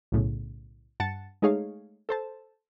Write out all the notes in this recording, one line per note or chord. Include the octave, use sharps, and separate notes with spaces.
B1 A2 C#3
G2 F#5 A5 A6 C#7
G#3 A3 D#4 G#4 C#5 F5
A4 C5 A5